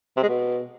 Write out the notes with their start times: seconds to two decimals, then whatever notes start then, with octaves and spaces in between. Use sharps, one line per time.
0.17 C3
0.23 G#3
0.28 B2